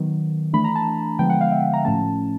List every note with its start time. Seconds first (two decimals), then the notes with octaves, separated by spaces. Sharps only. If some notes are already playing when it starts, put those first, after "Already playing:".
Already playing: D#3 F#3 B3
0.53 E3 A3 D4 B5
0.64 A#5
0.75 A5
1.19 D3 F3 G#3 B3 G5
1.30 F#5
1.41 F5
1.52 E5
1.74 A#5
1.85 A2 F3 A3 C#4 A5